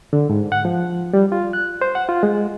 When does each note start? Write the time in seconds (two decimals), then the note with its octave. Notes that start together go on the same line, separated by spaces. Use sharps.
0.13 D3
0.30 G#2
0.52 F#5
0.65 F3
1.13 G3
1.32 F4
1.53 F#6
1.81 C5
1.95 F#5
2.09 F4
2.23 G#3